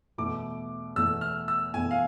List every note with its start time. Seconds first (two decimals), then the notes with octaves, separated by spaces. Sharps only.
0.18 E2 B2 A3 D6
0.96 E2 B2 A3 E6
1.21 F6
1.48 E6
1.74 E2 B2 A3 G#5
1.91 F5